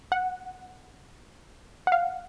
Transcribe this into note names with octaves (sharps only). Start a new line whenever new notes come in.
F#5
F#5
F5